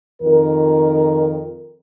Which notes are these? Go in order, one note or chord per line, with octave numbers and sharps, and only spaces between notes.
F2 D#3 A#4